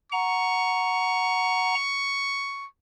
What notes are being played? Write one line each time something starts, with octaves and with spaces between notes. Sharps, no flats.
F#5 A#5 C#6